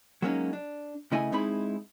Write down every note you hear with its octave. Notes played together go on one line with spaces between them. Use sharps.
F#3 G#3 A#3 C#4 D#4
D4
C#3 A3 E4 D#5 G#5
G#3 C4 D#4 E4 G#4 B5